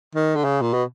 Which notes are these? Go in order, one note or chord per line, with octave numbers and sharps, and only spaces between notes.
D#3
D3
C#3
A#2
B2